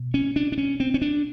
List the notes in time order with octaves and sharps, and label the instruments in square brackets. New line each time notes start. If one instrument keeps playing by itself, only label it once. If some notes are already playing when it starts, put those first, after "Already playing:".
Already playing: [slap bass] B2
C#4
D4
D4
C#4
C4
C#4
D4